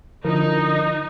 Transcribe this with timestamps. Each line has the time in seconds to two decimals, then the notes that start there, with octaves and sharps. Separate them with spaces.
0.25 D3 F3 D#4 E4 A#4